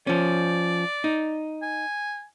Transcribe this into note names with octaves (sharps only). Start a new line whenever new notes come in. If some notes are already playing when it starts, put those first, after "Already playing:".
F3 C#4 D5
D#4
G#5